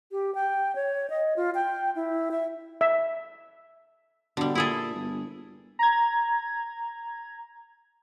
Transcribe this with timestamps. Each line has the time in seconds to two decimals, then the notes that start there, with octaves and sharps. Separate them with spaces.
0.12 G4
0.35 G5
0.75 C#5
1.10 D#5
1.37 F4
1.55 G5
1.96 E4
2.31 E5
2.81 E5
4.37 B2 D3 G3
4.55 A#2 E4 G#4 A4
4.94 G1
5.79 A#5 G#6